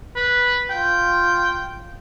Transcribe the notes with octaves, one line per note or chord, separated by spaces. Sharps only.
B4
F4 G5